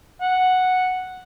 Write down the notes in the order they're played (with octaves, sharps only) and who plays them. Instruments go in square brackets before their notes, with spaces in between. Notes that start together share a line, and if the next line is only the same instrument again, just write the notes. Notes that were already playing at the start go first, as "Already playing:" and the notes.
[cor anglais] F#5